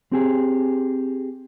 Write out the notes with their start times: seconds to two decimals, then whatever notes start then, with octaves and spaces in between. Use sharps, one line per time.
0.12 C4 G4 G#4